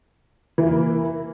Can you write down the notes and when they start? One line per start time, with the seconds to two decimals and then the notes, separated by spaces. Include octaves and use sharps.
0.58 E3
0.62 E4
0.67 A#3